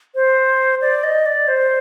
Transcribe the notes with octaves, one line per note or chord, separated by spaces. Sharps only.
C5
D5
D#5
D5
C5